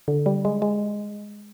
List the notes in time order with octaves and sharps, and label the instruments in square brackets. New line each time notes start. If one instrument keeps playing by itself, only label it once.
[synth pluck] D3
G3
G#3
G#3